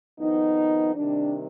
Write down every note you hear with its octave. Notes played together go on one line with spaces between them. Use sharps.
F2 D#3 B3 D#4
C3 D#3 G3 D4